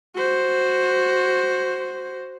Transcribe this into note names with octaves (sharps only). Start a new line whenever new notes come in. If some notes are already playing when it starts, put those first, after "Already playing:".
F#4 C5